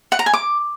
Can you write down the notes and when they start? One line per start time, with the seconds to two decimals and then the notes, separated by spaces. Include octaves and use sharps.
0.12 F#5
0.19 A#5
0.26 G#5
0.33 D6